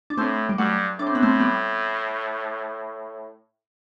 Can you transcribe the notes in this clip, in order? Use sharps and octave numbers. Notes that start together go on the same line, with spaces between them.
D4
A2 A3 C4
G3
G2 F#3 A3
A2 D4
C4
B3
A3 C4
C4
G3 B3